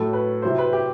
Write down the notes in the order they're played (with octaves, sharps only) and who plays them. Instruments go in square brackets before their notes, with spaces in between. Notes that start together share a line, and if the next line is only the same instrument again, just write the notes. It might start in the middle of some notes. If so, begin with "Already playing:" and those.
Already playing: [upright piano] A2 F#3 A3 A4
B4
C3 F#3 C4 E4 C5
B4
G4